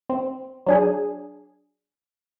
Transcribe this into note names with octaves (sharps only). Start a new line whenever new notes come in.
C4
F#3 D4 G#4